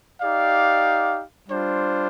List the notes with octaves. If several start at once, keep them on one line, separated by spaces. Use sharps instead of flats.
D#4 G4 D5 F5
G3 D4 F4 C5